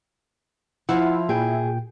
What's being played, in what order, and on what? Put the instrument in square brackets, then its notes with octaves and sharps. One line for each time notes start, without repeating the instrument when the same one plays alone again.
[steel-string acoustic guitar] F3 [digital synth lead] E4 [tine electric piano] F#5
[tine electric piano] A#2 G5 [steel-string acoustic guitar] G#4